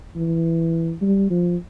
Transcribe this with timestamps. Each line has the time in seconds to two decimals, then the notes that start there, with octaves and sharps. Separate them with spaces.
0.16 E3
1.02 G3
1.30 F3